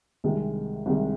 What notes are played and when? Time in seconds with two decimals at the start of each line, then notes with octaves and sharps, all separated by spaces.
0.24 C2 C3 D#3 G#3
0.86 C2 C3 D#3 G#3